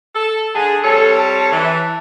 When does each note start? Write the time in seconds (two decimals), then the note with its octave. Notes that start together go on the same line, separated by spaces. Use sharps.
0.15 A4
0.55 D3 G#4 A5
0.83 F2 G3 A4 C#5
1.19 A5
1.51 E3